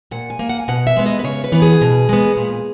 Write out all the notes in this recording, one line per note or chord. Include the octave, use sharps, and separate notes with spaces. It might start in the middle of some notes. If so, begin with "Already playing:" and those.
A#2 F#5
G#5
A#3
F#5
G#5
B2 F#5
E5
G#3 B3
D#5
B4
C#3 C#5
B4
E3 B3
G#4
B2
G#3 B3
A#2